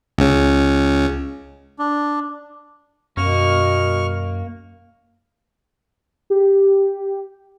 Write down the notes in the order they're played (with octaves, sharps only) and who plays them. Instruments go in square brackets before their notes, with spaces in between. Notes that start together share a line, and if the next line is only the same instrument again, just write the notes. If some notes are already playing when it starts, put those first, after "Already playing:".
[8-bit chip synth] C#2 C#3
[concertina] D4
[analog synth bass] F#2 [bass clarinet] B2 [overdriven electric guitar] A#3 [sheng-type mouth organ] C#6 F6
[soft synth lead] G4